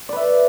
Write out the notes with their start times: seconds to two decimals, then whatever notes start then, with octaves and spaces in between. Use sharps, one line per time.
0.09 D5
0.13 B4
0.16 E5